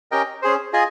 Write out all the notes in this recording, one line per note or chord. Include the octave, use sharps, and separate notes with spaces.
C#4 G4 A#4 D#5 G5
C#4 G#4 C5
F4 G#4 D#5 G#5